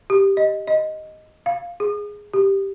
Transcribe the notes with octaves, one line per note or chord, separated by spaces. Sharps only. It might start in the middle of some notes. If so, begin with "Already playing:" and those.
G4
D#5
D#5
F5
G#4
G4